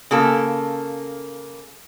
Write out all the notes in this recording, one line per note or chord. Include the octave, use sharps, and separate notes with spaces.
C#3 A#3 A4